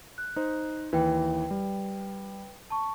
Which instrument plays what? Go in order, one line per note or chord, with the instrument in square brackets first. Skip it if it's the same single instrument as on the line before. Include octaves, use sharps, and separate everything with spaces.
[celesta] F#6
[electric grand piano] D#4 C5
[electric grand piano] D#2 E3 [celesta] B4 G5
[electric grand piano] G3
[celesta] A5 C#6